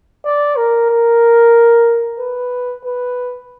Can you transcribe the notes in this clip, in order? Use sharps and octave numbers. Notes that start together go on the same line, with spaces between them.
D5
A#4
A#4
B4
B4